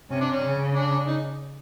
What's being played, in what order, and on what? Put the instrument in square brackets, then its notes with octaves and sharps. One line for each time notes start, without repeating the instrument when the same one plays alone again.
[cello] C3 [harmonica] C#4
[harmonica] D4
C#4
[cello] C#3
[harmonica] D4
D#4